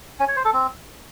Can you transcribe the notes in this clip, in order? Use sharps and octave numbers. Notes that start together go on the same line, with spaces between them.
C#4
C#5
C5
A4
C4